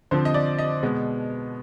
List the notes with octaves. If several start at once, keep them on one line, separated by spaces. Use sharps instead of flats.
D3 F3 C4 C5
D#5
D5
D#5
B2 G#3 B3